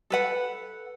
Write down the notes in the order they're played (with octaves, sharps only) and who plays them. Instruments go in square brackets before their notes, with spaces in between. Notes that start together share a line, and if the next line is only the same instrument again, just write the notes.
[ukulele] A4 B4 F#5